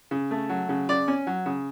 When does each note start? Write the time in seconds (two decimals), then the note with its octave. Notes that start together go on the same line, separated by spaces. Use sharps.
0.11 C#3
0.31 A3
0.49 F#3
0.69 C#3
0.89 C#3 D5
1.08 C#4
1.27 F#3
1.46 C#3